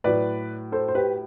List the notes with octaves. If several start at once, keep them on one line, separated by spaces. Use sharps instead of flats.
A2 F#3 B4 D5
A4 C5
C5
G4 B4